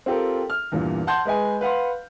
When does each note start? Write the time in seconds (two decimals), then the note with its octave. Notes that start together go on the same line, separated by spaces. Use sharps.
0.06 C4 F4 G4 A4 A#4
0.50 F6
0.72 E2 G2 A#2
1.07 F#5 A5 C6 G6
1.25 G#3 B4 D#5 G#5
1.61 B4 F5 F#5 C6